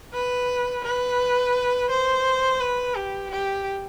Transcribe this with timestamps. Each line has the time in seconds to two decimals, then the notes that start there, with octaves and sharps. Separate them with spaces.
0.13 B4
0.84 B4
1.90 C5
2.60 B4
2.95 G4
3.31 G4